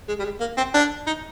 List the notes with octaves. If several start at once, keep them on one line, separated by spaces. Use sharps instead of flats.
G#3
G3
G#3
A#3
C4
D4
D#4